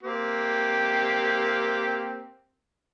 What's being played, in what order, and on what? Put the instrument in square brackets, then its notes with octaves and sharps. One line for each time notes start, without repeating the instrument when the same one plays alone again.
[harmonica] A#3 C4 G4